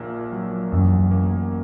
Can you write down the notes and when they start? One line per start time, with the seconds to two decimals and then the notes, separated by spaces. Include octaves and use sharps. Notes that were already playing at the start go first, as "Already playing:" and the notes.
Already playing: A#1 A#2 A#3
0.32 F#3
0.72 A1 F#2
1.11 A#3